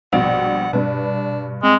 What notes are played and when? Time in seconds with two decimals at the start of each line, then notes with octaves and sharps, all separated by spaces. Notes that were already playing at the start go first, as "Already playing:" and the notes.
0.13 A#1 G2 B2 D5 F#5
0.73 G2 B2 D4 B4
1.63 G#3 C4